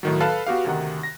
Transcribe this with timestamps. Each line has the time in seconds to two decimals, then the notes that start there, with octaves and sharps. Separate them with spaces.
0.03 A2 D#3 F#3
0.20 A4 B4 F5 A5 B5 F#6
0.47 B3 F#4 G4 F5
0.65 D2 C3 D#3 F#5
1.03 A#6